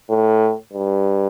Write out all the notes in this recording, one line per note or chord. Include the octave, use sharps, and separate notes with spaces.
A2
G2